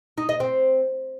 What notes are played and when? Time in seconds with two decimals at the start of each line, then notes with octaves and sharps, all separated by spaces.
0.18 D#4
0.29 D#5
0.40 C4